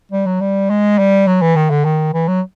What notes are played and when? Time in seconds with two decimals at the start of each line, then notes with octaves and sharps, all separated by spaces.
0.12 G3
0.26 F#3
0.41 G3
0.70 G#3
0.99 G3
1.27 F#3
1.41 E3
1.56 D#3
1.70 D3
1.85 D#3
2.14 E3
2.28 F#3